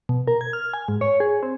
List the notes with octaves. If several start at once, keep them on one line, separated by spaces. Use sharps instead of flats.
B2
A#4
G#6
F6
G#5
G#2
C#5
G#4
C4